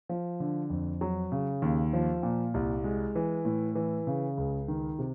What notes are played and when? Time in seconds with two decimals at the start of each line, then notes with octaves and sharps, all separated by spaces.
0.09 F3
0.40 D3
0.70 F2
1.01 F#3
1.32 C#3
1.62 D#2
1.93 F3
2.23 A#2
2.54 C2
2.84 G#3
3.15 E3
3.45 A2
3.75 E3
4.07 C#3
4.38 C#2
4.68 D#3
4.99 C3